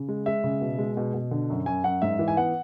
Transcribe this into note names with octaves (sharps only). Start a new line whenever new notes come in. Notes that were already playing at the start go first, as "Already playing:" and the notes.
Already playing: C#3
G#3
G#3 E5
C#3
B2
G#3
B2
B2
D3
F#2
F#2 G#5
F#2 F#5
G#2 E5
E3
G#5
B3 F#5